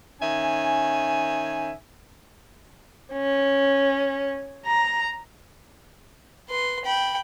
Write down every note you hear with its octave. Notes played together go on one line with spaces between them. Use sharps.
D#3 C#4 E5 G#5
C#4
A#5
B4 C6
G5 B5